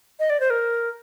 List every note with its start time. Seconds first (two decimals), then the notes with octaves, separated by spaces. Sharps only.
0.20 D#5
0.30 D5
0.40 C5
0.50 A#4